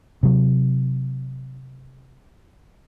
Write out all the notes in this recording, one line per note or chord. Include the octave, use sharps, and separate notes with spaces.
C3 F#3